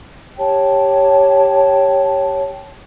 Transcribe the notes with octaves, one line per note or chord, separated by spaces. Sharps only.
G4 C#5 G5 A5